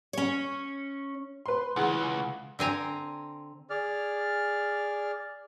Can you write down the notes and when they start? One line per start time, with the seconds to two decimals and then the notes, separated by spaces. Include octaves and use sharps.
0.13 C#4 C#5
1.46 B4 C6
1.76 C#2 E3 G#4 F#5
2.59 D3 C4 G#5 A#5
3.70 G#4 D5 F6